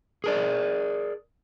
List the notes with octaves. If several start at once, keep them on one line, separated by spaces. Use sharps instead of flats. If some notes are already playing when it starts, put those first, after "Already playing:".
G#4 A#4 D5